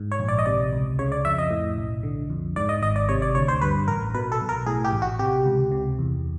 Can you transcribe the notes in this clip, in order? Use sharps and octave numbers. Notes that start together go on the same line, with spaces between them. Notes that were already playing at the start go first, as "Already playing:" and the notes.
Already playing: G#2
C#5
A#1
D5
D#5
C3 D5
C#2
C#3 C#5
D5
F2 E5
D#5
A2
B1
D3
F2
G#2 D5
D#5
G#1 D#5
D5
C3 C#5
D5
D2 C#5
C5
G2 B4
A1 A#4
B2 B4
A4
B1
A#4
A2 G#4
G4
A1
F#4
C3 G4
C#2
C3
E2